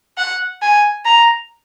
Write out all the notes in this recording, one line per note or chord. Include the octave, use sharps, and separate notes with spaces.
F#5
G#5
A#5